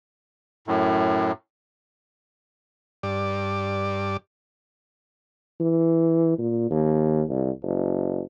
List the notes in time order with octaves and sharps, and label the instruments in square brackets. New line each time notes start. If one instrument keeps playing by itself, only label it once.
[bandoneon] F#2 A2
[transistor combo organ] G2 D5
[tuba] E3
A#2
D#2
C2
F#1